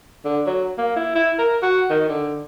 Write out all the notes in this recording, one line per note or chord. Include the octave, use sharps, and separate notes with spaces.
D3
F#3
A#3
E4
E4
A#4
F#4
D#3
D3